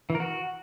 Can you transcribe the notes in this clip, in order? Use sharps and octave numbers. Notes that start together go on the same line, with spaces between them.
E3
A#4
F#4